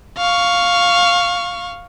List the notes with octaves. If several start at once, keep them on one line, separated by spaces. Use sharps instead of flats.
F5 C#6